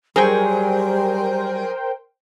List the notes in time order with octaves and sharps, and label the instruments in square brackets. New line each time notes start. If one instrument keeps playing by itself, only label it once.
[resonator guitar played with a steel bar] F#3 G#4 [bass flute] G3 [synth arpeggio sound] A#4 C5 G5